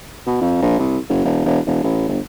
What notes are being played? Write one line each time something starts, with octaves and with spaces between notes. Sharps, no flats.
B2
F2
A#1
C2
F#1
E1
E1
E1
A1
G1